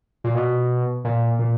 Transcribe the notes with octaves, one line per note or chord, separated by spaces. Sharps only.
A#2
B2
A#2
A#2